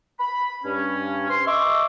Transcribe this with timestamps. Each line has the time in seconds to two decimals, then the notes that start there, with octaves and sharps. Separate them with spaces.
0.19 B5
0.64 G2 C#4
1.29 C6
1.46 D#5 E5 C#6 D6 E6